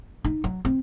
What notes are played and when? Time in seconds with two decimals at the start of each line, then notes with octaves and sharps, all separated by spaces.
0.24 D#4
0.44 F#3
0.65 C4